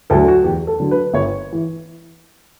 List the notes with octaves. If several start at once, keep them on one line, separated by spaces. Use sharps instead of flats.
D2 D3 F#3 A4
F#4
E2 G4
A4
D3 F#3
B4
G1 C#5
E3